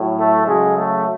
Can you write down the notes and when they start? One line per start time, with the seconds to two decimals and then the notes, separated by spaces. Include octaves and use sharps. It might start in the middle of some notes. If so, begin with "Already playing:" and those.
Already playing: A2 F#3
0.17 A3
0.46 C#3 F#3 G#3
0.75 A3